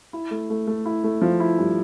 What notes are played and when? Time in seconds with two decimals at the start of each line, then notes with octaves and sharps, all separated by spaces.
0.13 E4
0.31 A3
0.50 A3
0.67 A3
0.86 E4
1.04 A3
1.22 F3
1.40 E4
1.58 G2